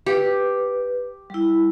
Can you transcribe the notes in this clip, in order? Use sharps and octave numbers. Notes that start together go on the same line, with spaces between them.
G4 B4
G3 E4